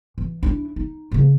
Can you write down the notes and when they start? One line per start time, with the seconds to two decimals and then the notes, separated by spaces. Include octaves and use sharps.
0.18 E3
0.43 D4 E4
0.76 D#4
1.11 C#3 A#3